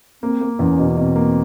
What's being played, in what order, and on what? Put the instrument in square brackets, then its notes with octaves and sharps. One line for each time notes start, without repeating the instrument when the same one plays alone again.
[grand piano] A#3 [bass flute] C4
[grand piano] A#3
[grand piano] E2 [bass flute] C#4
[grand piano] B2
[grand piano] B2 [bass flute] C4
[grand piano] A#3